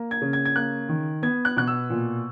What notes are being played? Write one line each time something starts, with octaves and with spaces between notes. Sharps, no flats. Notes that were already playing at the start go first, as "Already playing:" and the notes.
Already playing: A#3
G#6
C#3
G#6
G#6
A#3 F#6
D#3
B3 G#6
F#6
B2 F#6
E6
A#2